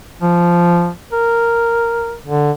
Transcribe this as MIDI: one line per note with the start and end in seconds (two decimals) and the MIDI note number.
0.22 0.90 53
1.13 2.14 70
2.26 2.51 50